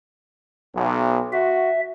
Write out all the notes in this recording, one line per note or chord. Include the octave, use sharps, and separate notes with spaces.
B1
F#4 E5